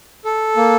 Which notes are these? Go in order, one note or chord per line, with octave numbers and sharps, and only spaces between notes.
A4
A#3